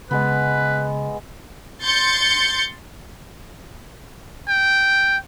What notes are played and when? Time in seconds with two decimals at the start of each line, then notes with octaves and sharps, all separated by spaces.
0.11 C#3 G#3 B3 B4
1.81 C6 G6 A6 C#7
4.48 G5